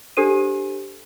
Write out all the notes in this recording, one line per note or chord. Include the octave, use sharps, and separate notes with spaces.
D4 G4 A4 C5 D#7